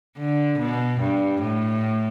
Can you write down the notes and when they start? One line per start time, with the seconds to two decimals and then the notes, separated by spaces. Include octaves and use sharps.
0.18 D3
0.58 B2
1.00 G2
1.42 A2